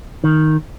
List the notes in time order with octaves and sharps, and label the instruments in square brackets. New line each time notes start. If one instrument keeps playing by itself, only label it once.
[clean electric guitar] D#3